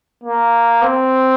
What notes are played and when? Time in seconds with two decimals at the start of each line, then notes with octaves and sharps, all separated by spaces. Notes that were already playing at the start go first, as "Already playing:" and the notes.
0.24 A#3
0.83 C4